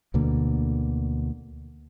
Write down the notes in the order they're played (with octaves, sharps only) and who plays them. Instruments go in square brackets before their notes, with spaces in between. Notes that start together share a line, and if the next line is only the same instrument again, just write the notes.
[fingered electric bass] D2 B2 D3 A#3